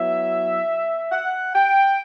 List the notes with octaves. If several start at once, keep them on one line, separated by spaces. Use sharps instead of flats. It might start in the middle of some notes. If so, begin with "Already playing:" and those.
Already playing: F#3 B3 E4 E5
F#5
G5